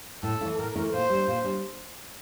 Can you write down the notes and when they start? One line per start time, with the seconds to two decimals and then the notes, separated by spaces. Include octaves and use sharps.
0.23 A2 A4
0.41 E3 A3 E4
0.58 A2 A#4
0.75 E3 A3 E4
0.92 A#2 C5
1.10 G3 D4
1.28 A#2
1.44 G3 D4